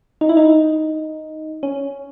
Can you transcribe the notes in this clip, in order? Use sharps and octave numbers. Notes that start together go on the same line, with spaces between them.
D#4
E4
D#4
C#4